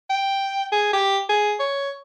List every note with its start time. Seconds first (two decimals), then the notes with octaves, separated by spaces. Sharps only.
0.10 G5
0.72 G#4
0.93 G4
1.29 G#4
1.60 C#5